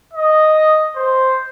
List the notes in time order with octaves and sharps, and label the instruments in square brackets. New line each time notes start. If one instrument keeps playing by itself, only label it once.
[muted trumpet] D#5
C5